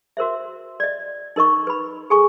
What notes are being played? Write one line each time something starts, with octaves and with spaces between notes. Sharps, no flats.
F#4 A#4 C5 E5
D5 D#5
D#4 A#4 D#5 C#6
B4 B5
G#4 A4 G#5 C#6